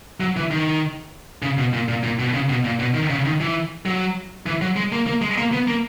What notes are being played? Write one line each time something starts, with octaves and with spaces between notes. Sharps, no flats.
F#3
E3
D#3
C#3
B2
A#2
A#2
A#2
B2
C#3
B2
A#2
B2
D#3
C#3
D#3
E3
F#3
E3
F#3
G#3
A#3
A#3
G#3
A#3
B3
A#3